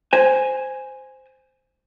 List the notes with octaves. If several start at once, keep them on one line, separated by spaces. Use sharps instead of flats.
C5 G#5